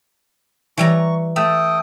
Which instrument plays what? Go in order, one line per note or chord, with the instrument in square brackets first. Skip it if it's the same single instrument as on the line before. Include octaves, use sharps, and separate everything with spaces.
[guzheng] E3 G3 A#5 [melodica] C#6
[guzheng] A3 [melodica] A4 G5 D#6